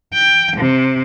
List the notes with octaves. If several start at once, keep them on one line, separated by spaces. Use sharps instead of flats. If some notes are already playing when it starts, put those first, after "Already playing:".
G5
C3